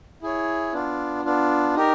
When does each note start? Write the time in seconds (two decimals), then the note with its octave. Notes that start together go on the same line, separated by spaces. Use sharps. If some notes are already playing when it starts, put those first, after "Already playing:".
0.22 E4 G#4 C#5
0.73 B3 D4 F4
1.24 B3 D4 F4
1.75 D#4 G4 A#4